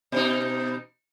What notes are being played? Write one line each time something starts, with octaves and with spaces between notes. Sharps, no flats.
B2 D#4